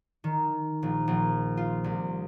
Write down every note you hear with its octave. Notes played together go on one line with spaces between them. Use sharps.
D#3
A#1
A#1
F4
C2